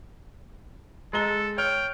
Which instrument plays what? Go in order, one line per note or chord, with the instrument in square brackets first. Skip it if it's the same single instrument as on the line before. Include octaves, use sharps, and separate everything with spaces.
[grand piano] G#3 A#5 G7 [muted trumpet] A4
[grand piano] C#5 F6 [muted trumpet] G5